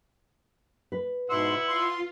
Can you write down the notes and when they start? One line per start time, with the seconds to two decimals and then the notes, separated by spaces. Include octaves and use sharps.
0.92 B4
1.30 G#2 B2 E4 F#5 C6 E6
1.68 F4 C6